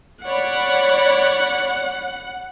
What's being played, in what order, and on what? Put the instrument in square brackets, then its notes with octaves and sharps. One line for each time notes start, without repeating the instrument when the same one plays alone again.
[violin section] C#5 D5 B5 [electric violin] F#5